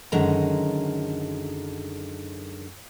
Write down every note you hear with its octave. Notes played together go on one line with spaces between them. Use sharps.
F#2 D3 D#3 G#3 A#5